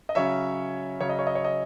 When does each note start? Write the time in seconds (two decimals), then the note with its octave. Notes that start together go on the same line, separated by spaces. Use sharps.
0.09 D#5
0.15 C#3 F#3 C#4 C#5 E5
1.01 C#3 F#3 C#4 C#5
1.09 D#5
1.19 C#5
1.27 D#5
1.35 C#5
1.45 D#5